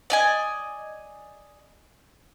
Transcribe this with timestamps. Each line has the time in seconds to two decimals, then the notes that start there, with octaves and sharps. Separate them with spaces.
0.10 D5 D#5 G#5